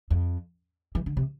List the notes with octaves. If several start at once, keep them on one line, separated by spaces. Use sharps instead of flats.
F2
E3
D3
C3